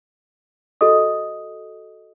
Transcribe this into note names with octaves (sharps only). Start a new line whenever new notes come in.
F#4 A4 D#5 D#6